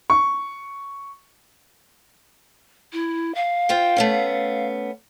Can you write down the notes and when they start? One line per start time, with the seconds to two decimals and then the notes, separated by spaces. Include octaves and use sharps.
0.10 C#6
2.93 E4
3.35 F5
3.69 F4 C5 G5
3.97 A3 B3 C#4